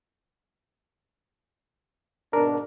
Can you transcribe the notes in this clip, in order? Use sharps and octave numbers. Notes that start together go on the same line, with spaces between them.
G#1 B2 D4 A#4